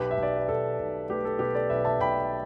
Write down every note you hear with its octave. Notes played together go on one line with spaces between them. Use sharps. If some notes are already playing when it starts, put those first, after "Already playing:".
Already playing: B1 G4 B4
E5
B1
D5
B4
B1 A4
B1
A3 G4 B4
A4
B2 G4 B4
A4 D5
B1 B4 E5
E5 A5
B1 G5 B5